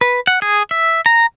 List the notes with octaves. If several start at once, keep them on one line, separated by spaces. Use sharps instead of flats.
B4
F#5
G#4
E5
A#5